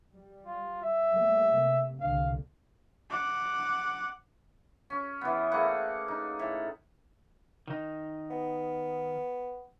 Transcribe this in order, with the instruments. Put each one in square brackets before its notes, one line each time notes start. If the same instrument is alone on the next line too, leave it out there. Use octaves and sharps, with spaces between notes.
[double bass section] G3
[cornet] F4
E5
[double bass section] G3 A3 A#3
C3
[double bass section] C2 A#2 D3 [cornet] F5
[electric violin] F#5 D6
[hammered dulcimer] C#4
E3 B3
A3 A#3 G#4 F#5
D#4
A2
[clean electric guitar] D#3 D#4
[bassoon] B3